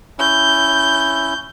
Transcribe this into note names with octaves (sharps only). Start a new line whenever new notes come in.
C#4 E4 G6